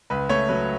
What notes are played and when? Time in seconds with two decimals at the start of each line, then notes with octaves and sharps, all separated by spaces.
0.10 C#2 B4
0.29 A3 C#5
0.49 F#3 B4